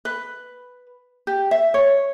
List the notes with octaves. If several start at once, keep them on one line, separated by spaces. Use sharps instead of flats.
B4
G4
E5
C#5